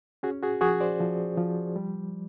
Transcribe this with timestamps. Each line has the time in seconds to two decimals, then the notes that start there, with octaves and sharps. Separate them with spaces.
0.23 C#4 F#4 G#4
0.42 F#4 G#4
0.61 F3 F#4 G#4
0.80 C5 D5
1.00 F3
1.37 F3
1.76 G3